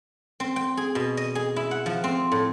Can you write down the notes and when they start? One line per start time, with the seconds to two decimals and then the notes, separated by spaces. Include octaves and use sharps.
0.40 C4
0.56 G5
0.77 G#4
0.95 B2
1.17 D#5
1.35 G#4
1.56 E4
1.71 F#5
1.86 F3
2.04 C4
2.32 A2